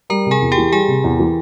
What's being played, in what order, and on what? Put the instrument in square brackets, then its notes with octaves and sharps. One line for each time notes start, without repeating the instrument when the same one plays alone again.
[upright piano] G3 [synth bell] A#4 A#5
[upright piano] C3
[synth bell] G#4 G#5
[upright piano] E2
[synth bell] G4 G5
[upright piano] E3
[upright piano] G3 [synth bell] G#4 G#5
[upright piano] C3
E2
E3